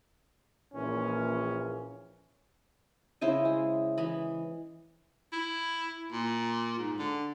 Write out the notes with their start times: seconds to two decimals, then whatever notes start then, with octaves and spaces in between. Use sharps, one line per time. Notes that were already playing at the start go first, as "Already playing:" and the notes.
0.74 A#1 A#2 E3 C#4
3.21 C#3 E4 C5 D#5
3.45 G#3
3.98 E3 D#5 B5
5.33 E4
6.12 A#2
6.78 G#2
6.99 D3